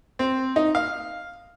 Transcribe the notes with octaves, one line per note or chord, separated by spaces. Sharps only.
C4
D#4
F5